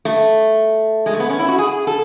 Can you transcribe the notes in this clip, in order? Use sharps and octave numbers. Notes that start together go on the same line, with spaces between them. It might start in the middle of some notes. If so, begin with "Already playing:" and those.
A3
G#3
A3
B3
C#4
E4
F#4
G#4
A4